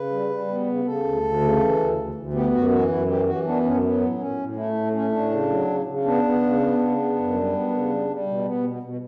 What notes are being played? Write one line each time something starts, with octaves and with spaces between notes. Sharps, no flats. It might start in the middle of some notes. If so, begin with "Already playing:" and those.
Already playing: C#3 B4
G3
G3
B3
C#3
C#3 A4
D2
D2
C#3
E3
D2
D2
D2
B3 G4
F#2 F#4
E3 F#4
F#2 E4
E3 G4
E3 F#4
B3 D4
F#2 C#4
F#3 B3
A2
A2 C#4
A2
A3 E4
A2
A3 C#4
A2 D4
C#3
F#3
C#3
C#3
B3 D4
B3
C#3
B3
C#3
B3
F#2
G3
B3
C#3
G3
G3
B2
B3
B2
B2